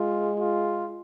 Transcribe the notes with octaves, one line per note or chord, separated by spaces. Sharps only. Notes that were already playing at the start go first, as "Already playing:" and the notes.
Already playing: G#3 F4
F4